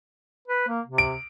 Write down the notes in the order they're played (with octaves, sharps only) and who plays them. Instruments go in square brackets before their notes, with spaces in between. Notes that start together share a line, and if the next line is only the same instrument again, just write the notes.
[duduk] B4
A#3
C3
[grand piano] D7